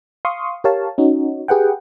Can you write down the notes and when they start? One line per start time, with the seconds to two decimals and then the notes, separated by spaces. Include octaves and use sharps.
0.25 F5 C6 C#6 D#6
0.64 G4 A#4 C#5 F5 A5
0.98 C#4 D#4 F#4
1.48 G4 G#4 B4 F#5 G5